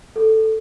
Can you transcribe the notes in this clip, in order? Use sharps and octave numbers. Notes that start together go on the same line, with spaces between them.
A4